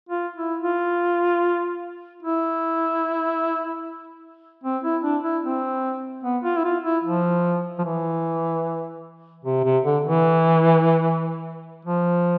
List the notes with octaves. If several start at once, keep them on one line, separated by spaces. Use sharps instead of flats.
F4
E4
F4
E4
C4
E4
D4
E4
C4
B3
F4
E4
F4
E4
F3
F3
E3
C3
C3
D3
E3
F3